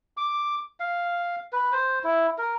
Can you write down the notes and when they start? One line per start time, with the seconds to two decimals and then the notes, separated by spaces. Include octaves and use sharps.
0.17 D6
0.80 F5
1.53 B4
1.72 C5
2.04 E4
2.38 A#4